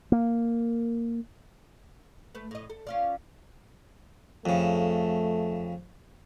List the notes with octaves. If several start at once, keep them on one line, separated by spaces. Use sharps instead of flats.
A#3
A3 B4
A2 D#5
A4
C#4 F4 D5
F2 C#3 A3